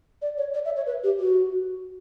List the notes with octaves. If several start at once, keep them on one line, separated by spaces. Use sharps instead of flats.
D5
C#5
D5
E5
C#5
B4
G4
F#4